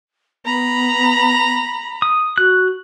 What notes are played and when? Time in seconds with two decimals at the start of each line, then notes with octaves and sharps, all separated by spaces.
0.45 B3 A#5 B5
2.02 D#6
2.38 F#4 F#6